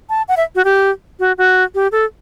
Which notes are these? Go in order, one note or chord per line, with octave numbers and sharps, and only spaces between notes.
A5
F#5
E5
F#4
G4
F#4
F#4
G4
A4